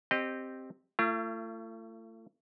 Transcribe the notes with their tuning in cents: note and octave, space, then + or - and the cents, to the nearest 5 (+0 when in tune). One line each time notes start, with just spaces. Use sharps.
C4 +0 G4 +0 D#5 -20
A3 +30 F4 -45